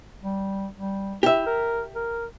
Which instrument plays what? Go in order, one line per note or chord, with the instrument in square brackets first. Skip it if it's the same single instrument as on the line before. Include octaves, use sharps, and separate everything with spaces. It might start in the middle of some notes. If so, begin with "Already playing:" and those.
[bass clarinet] G3
G3
[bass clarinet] E4 [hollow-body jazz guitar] G4 E5
[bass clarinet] A#4
A#4